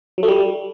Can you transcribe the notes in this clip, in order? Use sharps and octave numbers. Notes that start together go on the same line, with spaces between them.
F#3
A3
G3